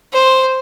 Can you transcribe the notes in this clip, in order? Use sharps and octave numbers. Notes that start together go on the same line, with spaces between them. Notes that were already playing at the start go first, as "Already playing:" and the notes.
C5